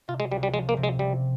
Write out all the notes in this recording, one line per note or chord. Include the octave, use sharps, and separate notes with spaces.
C3 F4
G#3
C#2 G3
G3
F3 G#3
A#3
C3
G#3
C3 G3